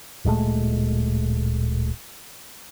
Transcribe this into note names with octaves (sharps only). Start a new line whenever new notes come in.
D1 A#2 G#3 A3